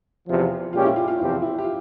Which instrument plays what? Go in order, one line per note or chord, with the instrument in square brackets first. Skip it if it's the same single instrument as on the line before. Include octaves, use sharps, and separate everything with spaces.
[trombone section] E2 C3 F3
[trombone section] A#2 G#3 C#4 G4 [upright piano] F4
[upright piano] E4
F4
F4
[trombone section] E2 C3 F3 C4 G4 [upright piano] E4
[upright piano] E4
G4
F4